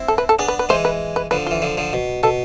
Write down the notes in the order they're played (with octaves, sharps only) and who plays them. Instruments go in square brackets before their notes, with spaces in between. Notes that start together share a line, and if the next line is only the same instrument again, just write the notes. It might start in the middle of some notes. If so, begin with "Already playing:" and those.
Already playing: [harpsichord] C4 E4
[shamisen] A4
B4
A4
[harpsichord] B3 D4 [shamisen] G#4
[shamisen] B4
B4
[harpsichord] E3 G#3 [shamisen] C5
[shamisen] B4
B4
[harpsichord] D3 F3 [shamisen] B4
[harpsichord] E3 [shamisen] F4
[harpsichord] D3 F3
D3 F3
B2
[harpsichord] B2 [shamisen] A4